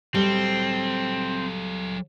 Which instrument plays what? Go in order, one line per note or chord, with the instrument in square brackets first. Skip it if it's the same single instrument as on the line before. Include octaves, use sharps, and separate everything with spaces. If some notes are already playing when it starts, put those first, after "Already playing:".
[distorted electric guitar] F#3 A4 [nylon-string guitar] G3 [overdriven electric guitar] C4